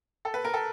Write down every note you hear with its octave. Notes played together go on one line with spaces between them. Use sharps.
A4
B4
A#4
A4